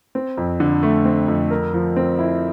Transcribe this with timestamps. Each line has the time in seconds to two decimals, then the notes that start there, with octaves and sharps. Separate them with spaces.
0.15 C4
0.37 F2
0.60 D3
0.83 A3
1.05 C4
1.28 F2
1.51 A#4
1.74 F3
1.96 C4
2.19 E4